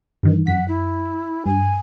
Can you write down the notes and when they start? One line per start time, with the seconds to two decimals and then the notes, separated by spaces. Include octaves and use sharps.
0.23 G2 D#3 E3
0.47 F#2 F#5 B6
0.68 E4
1.46 G2 G#5